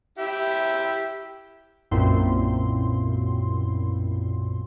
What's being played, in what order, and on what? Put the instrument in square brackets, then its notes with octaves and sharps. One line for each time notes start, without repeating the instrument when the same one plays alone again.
[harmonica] E4 G4 E5
[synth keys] B1 F#2 A#2 C4 E4 C6